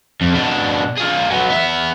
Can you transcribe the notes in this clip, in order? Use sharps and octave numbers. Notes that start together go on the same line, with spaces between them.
F2
B2 D4
F4 G#4
F#3 B3
B3 E5